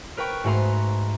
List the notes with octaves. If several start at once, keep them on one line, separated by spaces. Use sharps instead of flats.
A#4 B4 G5 C#6
G#2 A3 F#4 B4 A#5 C6